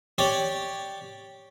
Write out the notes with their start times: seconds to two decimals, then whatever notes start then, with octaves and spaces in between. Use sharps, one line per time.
0.18 G4 C#5 D5